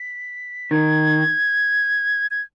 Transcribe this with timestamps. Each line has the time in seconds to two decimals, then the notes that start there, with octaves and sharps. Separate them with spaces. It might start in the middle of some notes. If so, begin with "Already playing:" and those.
Already playing: B6
0.71 D#3 G#6
2.31 G#6